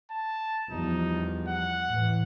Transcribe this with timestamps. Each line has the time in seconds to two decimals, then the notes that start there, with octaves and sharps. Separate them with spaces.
0.11 A5
0.71 E2 F3 G3 D#4
1.49 F#5
1.91 A2 E3